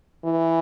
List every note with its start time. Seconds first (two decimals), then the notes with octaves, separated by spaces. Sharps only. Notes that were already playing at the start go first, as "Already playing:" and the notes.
0.24 E3